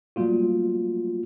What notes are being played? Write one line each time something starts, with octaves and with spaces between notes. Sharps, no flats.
F#3 G3 A3 A#3 F4 F#4